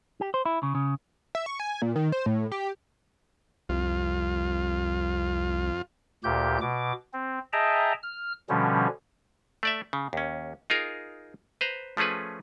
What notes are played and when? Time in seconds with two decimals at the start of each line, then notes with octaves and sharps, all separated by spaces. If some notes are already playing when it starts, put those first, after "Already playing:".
0.21 G4
0.34 C5
0.45 E4
0.63 C#3
0.75 C#3
1.35 E5
1.46 C#6
1.60 G#5
1.82 A#2
1.96 D#3
2.12 C5
2.26 A2
2.52 G4
3.69 C2 F2 F4
6.24 D2 A#2 G4 G6
6.61 B2 D6
7.13 C4
7.53 G#4 D#5 E5 G5 A5 A#5
8.03 F6
8.49 B2 D3 F3 G3 C#4
9.63 A3 D5 E5
9.93 C#3
10.13 D#2 C#4
10.70 D#4 F4 G#4 A#4
11.61 B4 C5 A#5
11.97 F3 A3 C#4 G#4 B4